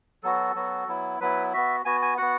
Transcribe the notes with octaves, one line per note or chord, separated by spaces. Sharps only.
F#3 B3 F#4 A4
F#3 B3 F#4
F#3 B3 E4
F#3 B3 E4 B4
B3 F#4 E5
B3 F#4 G#5
G#5
B3 F#4 F#5